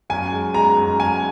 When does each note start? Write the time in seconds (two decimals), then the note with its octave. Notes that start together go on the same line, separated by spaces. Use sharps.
0.10 F#2 G#5
0.32 G#3
0.54 G#3 A#5
0.77 F#2
0.99 G#3 G#5